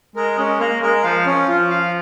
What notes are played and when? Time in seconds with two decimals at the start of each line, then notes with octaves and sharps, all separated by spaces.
0.16 G#3 A#4
0.38 G#3 C#4
0.59 A#3 A#4
0.82 G#3 A#4
1.04 F3 F5
1.26 C#4
1.48 F3 F4
1.71 F5